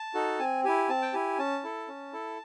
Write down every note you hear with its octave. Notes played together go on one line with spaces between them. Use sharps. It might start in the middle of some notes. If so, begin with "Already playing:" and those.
Already playing: A5
D#4 F#4 A4
C4 G#5
E4 G4 G#5
C4 A5
G5
E4 G4 G#5
C#4 A5
E4 A4
C#4
E4 A4